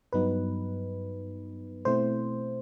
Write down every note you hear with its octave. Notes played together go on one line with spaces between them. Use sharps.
G2 F#3 B3 D#4 B4
B2 A3 C4 E4 C5